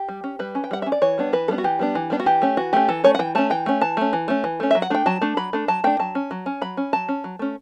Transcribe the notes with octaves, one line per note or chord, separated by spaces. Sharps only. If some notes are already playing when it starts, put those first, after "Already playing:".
Already playing: G4
G3
C#4
G3 B4
C#4
G5
G3 F#5
C#4 E5
D5
E3 C#5
G3 B3 D4
E3 B4
G3 B3 D4 A4
F#4
E3 G4
G3 B3 D4
E3
G3 B3 D4
F#4
E3 G4
A3 C#4
E3 F#4
A3 C#4 G4
E3 A4
A3 C#4 C#5
F#5
E3 G5
A3 C#4 A5
E3 G5
A3 C#4
E3 A5
A3 C#4
E3
A3 C#4
E3
A3 C#4
F#3 E5
F#5
A3 D4 G5
F#3 A5
A3 D4
F#3 B5
A3 D4
F#3 A5
A3 D4 G5
F#3 A5
C#4
F#3
C#4
F#3 B5
C#4
F#3 A5
C#4
F#3
A3 C#4